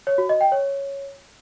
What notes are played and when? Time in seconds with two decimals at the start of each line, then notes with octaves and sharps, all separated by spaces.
0.07 C#5
0.18 F#4
0.29 D#5
0.41 G5
0.52 C#5